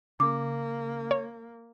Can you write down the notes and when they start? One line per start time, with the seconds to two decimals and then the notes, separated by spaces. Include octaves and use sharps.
0.20 C#3 A#3 D6
1.11 C#5